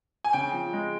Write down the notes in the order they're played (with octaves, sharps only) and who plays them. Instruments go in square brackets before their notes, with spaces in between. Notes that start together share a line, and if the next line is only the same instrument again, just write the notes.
[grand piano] G#5
[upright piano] C#3 [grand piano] G5
[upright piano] F3
G#3